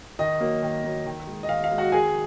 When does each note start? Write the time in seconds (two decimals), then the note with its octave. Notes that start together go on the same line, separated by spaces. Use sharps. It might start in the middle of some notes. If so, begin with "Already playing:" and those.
0.19 D#3 D#5
0.40 F#3 A#3
0.63 D#3
0.84 F#3 A#3
1.06 D#3
1.27 G#3
1.43 D#5
1.49 D#3 F5
1.64 F5
1.71 G#3
1.78 F#4 F#5
1.92 D#3 G#4 G#5